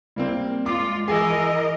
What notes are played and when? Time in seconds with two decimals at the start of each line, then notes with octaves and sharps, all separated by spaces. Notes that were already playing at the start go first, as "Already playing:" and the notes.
0.16 G3 A#3 C4
0.66 G#3 F4 D6
1.08 E3 G#4 A#4 D#5 G#5 E6